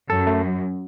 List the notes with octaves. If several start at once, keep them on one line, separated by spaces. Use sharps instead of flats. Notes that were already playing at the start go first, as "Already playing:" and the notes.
F#2 A4
A3